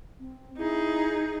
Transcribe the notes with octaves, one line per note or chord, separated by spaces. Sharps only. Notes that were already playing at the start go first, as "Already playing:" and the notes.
C4
D#4 E4 G#4